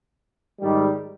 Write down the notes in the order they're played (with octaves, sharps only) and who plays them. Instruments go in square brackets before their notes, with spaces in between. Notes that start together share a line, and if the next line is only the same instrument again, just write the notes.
[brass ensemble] G#2 D#3 G3